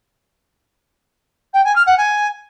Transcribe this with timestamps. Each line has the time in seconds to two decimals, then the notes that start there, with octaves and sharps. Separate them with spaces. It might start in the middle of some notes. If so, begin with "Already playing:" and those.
1.53 G5
1.64 G#5
1.75 F6
1.86 F#5
1.97 G#5